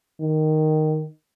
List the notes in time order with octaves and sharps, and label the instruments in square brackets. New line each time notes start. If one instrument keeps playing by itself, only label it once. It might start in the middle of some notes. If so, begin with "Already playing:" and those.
[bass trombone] D#3